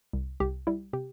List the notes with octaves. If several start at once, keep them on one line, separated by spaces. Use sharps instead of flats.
C2
C2 G4
G3 E4
C3 G4